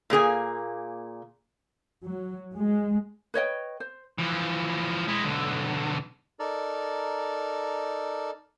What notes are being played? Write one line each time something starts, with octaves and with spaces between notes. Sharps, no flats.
A#2 A#3 G#4 G#5
F#3
G#3
B4 C#5 D#5 G5
C5
E3 F3
G#3 E4
B1 D3
D#4 A4 A#4 D5